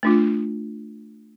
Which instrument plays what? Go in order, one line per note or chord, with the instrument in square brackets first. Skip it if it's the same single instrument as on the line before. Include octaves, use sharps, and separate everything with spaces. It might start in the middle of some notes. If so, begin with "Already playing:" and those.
[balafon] A3 D4 F4